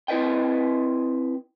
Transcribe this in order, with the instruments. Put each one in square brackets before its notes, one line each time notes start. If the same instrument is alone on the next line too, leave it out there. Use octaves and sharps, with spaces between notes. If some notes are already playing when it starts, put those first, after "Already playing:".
[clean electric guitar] C4 E4 B4 D#5 G5